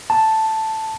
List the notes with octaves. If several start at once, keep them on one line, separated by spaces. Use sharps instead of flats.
A5